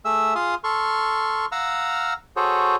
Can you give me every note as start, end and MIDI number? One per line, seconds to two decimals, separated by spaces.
0.05 0.34 57
0.05 0.34 68
0.05 0.34 76
0.05 0.34 88
0.35 0.55 65
0.35 0.55 68
0.35 0.55 77
0.35 0.55 84
0.35 0.55 87
0.64 1.46 69
0.64 1.46 84
0.64 1.46 85
0.64 1.46 89
1.52 2.13 77
1.52 2.13 78
1.52 2.13 82
1.52 2.13 88
1.52 2.13 89
2.36 2.76 66
2.36 2.76 68
2.36 2.76 69
2.36 2.76 72
2.36 2.76 73